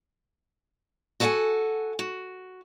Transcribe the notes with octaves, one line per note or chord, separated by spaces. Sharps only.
F#4 A4 B4 E5 F#5 G#5
F#4